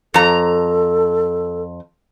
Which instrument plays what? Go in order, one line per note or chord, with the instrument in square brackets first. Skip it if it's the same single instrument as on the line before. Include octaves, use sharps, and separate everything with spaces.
[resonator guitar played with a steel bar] F2 A#5 [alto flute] A4